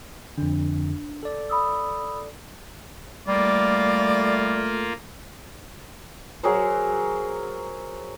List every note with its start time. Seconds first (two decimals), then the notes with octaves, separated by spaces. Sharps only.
0.38 F2 D3 D4
1.23 A4 D5
1.50 B5 D#6 E6
3.27 G3 A3 A#3 F4 D5
6.43 F#3 G#4 A#4 C5